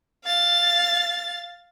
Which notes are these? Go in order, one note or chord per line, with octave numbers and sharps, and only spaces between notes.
F5 A6